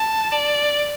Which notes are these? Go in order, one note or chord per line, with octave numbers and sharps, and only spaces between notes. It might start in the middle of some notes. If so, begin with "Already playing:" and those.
Already playing: A5
D5